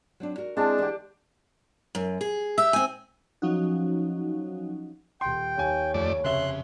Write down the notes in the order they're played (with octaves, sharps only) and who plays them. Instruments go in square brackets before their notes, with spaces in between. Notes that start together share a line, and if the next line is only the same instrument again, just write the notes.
[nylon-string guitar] F#3 C4 D4
F#4 A#4
[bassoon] G#3 [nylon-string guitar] C4 E4 G#4 [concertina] D4 [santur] G5 A5
[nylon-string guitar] D2 E3 E5 [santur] G4 D5
[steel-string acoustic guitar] F#2
G#4
[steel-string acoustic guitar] G4 E5 [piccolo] E6
[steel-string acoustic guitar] C4 G#5
[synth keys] F3 F#3 C#4 D#4 F#4
[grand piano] D#1 C6 [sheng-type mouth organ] G5
[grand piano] D#2 G#5 [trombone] C#5
[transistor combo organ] F2 A3 D5
[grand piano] F1 E5 G7 [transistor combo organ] C#3 [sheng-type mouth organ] C6 F#6